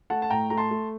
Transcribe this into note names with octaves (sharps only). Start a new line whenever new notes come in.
A3 F#5 A5
A5
A2 G5 A#5
A3 A#5
A5 C6
A3